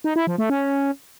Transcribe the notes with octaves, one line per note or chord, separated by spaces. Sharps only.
D#4
E4
F3
A3
C#4